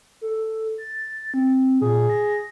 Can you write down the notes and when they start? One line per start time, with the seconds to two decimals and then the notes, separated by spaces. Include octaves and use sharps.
0.21 A4
0.78 A6
1.34 C4
1.81 A#2 G#4
2.10 A#6